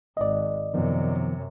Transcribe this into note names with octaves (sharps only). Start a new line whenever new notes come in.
G#1 D5 D#5
F#2 C3 D#3 F3 B3